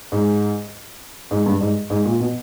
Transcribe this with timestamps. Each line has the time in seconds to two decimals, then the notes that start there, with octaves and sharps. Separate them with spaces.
0.12 G#2
1.31 G#2
1.46 G2
1.61 G#2
1.90 G#2
2.05 A#2
2.20 B2